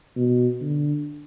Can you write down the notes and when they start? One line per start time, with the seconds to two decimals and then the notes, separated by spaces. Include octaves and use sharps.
0.16 B2
0.61 D3